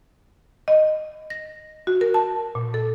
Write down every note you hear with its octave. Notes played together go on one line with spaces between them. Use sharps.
D#5
A#6
F#4
A#4
A5
A#2
A4